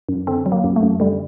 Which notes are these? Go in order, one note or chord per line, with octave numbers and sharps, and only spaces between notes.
F#2
D3 C4
F#3
A#3
F#2
A3
F#2
D3 G3